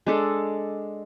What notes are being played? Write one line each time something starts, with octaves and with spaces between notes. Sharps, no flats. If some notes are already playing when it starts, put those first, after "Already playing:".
G#3 D4 A4